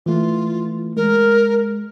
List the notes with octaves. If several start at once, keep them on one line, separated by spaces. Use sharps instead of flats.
E3 A3 F4
G#3 A#4